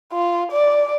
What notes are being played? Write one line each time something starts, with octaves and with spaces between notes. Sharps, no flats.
F4
D5